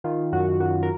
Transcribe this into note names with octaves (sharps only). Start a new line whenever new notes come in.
D#3 F4
F#2 F#4
F#2 F#4
A#4